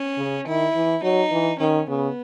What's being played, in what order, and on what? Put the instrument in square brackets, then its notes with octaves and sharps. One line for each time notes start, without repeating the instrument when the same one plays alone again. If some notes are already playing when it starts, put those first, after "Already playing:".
Already playing: [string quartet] C#4
[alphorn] C#3
[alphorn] D#3 [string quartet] E4
[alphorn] E3
[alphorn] F#3 [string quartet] D#4
[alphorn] E3
[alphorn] D#3 [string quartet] C#4
[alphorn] C#3 [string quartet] B3